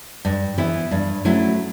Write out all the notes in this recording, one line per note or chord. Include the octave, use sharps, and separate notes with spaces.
G2
E3 B3 E4
G2
F#3 A3 C#4 E4